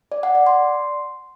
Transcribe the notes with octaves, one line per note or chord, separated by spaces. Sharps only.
D5
F#5
D5
C6